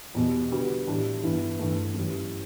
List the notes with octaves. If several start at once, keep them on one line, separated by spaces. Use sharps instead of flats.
E2 B2 G3
D3 G3 B3 F#4
A2 E3 G3 D4
G2 E3 B3 E4
G2 E3 A3
F#2 E3 G3